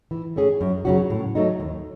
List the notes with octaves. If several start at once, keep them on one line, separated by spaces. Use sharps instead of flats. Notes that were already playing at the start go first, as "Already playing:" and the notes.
E3
A3 C#4 G#4
F#2
C#3 F#3 C#4 F#4
A2
F#3 A3 D#4
D#2